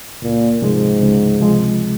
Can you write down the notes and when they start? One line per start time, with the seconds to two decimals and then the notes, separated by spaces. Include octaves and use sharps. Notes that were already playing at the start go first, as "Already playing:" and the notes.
0.22 C#2 A#2
0.62 G#2 C3 F3 G#3
1.01 C#2
1.40 C3 F3 G#3